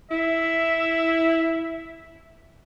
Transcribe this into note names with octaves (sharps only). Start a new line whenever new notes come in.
E4 E5